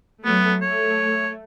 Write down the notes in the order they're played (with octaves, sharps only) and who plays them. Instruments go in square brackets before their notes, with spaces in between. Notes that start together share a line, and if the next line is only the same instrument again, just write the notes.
[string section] F#3 A3 [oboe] B3
[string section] A3 [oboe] C#5